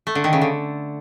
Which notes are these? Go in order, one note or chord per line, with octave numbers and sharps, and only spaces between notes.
A3
D3
D#3
C#3
D3